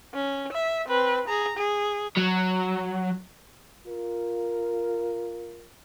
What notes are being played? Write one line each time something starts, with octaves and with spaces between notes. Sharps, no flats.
C#4
E5
C4 B4
G#4 A#5
G#4
F#3
F4 A#4